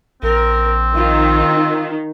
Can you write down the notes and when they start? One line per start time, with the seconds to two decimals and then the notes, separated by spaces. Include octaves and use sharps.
0.23 A#1 C4 A#4
0.95 D#3 F4